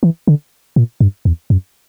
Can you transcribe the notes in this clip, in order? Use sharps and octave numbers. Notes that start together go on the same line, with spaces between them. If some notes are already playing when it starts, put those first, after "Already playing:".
E3
D3
A#2
G2
E2
F#2